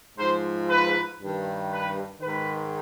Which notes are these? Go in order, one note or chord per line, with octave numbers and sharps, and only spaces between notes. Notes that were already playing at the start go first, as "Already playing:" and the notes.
G#2 F3 C5
B4
G2
D#3
B4
G#2 D#3 B4